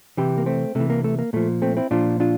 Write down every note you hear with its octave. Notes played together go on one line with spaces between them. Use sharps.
C3 E3 E4 G4
A#3
A3 C4
C3 E3 A3
A#3
A3
A#3
A#2 F3 A3
A3 C4
C4 E4
A#2 F3 D4 F4
D4 F4